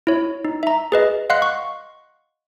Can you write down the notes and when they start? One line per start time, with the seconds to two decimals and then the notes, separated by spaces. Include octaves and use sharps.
0.07 E4 C#5
0.45 D#4
0.63 E5 A#5
0.92 G#4 B4 D#5
1.30 D#5 F5 F#5 C6 F#6 C7
1.42 C#6